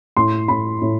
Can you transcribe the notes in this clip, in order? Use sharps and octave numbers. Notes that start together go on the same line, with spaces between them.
A2 C6
A2 B5
A2